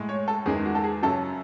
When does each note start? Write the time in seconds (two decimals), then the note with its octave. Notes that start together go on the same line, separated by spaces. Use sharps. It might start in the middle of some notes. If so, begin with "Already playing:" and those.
Already playing: A2 G#3
0.09 C#5
0.28 A4
0.46 E2 D#3 G#3 G#4
0.65 F#4
0.75 A4
0.84 G#4
1.03 F#2 C#3 F#3 A4